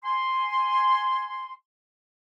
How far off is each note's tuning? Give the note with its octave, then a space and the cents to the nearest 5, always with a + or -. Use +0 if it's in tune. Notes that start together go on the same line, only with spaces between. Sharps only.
G#5 +0 C6 +0